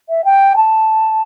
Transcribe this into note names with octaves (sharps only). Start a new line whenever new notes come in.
E5
G5
A5